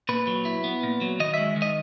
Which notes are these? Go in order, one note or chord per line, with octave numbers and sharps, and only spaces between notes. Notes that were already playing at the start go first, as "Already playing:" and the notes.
A#2 B4
F#3
E4
B3
A#2
F#3
D#3 D#5
G#3 E5
D#3
D#5